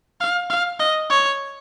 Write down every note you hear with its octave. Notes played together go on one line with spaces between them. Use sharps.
F5
F5
D#5
C#5